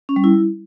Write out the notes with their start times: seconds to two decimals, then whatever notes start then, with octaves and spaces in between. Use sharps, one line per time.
0.09 C#4
0.16 G3
0.24 E4